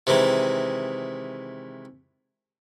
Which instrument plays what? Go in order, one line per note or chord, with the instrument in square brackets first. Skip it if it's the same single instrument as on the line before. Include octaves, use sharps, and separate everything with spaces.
[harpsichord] C3 D#3 E3 G#3